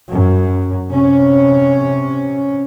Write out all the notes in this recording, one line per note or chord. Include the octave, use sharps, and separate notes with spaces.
F#2
C3 C#4